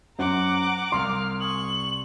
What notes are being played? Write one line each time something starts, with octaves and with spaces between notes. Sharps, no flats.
F#2 C5 F#5 A#5 D6
C2 G3 F5 C6 F6
G#5 C#6 D#6 F#7